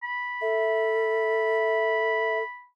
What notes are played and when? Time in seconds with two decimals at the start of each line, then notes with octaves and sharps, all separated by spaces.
0.03 B5
0.41 A4 E5